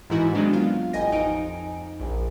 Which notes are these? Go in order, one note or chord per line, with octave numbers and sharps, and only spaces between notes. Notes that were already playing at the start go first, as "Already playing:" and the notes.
G#2 D#3 E3 E4 F#4
D#3 F#3 G#3 B3 C4 D4
F4 F5
A1 D#5 G5 G#5 A#6
F2 D#4 G#5 D7
A#1